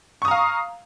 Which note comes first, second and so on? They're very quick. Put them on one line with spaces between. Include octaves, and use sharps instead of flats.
C#6 D#6 A#5 F5